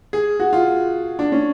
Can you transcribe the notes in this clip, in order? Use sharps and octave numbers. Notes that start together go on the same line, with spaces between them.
G#4
F#4
F4
D4
C#4